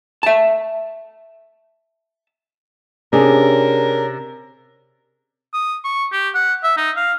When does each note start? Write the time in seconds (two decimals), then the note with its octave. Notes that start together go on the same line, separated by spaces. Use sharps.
0.23 E5 A5
3.13 C3 C#4 D4 G#4 A#4
5.54 D#6
5.84 C#6
6.12 G4
6.35 F#5
6.63 E5
6.77 D#4
6.96 F5